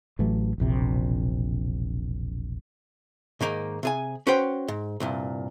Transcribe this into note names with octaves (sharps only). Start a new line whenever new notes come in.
A1 E3 F#3 A3
E1 A#1 C3
G#2 D#3 A#3 D#4
C3 G#4 G#5
C#4 F#4 B4 C5 G5
G#2
C2 G2 A#2